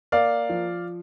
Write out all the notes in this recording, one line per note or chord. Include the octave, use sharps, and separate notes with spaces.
A#3 D5 F5
F3